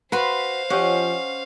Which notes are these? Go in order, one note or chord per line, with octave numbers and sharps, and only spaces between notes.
F#4 B4 C5 F5 B5 C6
F3 C#4 G4 C#5 D#5 F#5